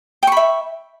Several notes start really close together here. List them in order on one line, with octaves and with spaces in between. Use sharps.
G5 C#6 B5 E5